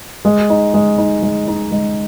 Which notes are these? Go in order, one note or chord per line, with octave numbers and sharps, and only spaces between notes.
G#3
D#4
G#3
D#4
G#3
D#4
G#3